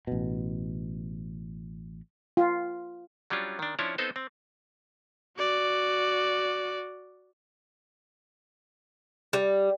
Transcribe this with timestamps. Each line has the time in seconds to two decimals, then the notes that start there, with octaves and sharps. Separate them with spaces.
0.07 A1 B2
2.37 F4
3.30 F#3 G3 C#4 D4 F4
3.59 D#3 D4
3.79 F3 C#4 D4 E4 C#5
3.98 B3 C4 D#4 A4 C5 D#5
4.16 C4
5.38 F#4 D5
9.33 G3